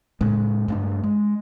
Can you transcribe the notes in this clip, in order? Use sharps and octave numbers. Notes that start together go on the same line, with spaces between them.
A2 C#3 G#3
G2 A3 D4
G#3